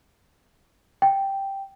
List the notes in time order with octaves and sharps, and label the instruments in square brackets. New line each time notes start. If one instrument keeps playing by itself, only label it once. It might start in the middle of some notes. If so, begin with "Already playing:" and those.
[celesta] G5